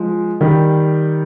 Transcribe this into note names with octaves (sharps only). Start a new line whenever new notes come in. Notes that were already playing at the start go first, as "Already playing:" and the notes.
Already playing: F3 G#3
D#3 G3